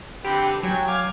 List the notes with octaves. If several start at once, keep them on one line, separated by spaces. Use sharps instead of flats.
D3 C4 G4 B4
F#3 G5 G#5
F5 G#5 D6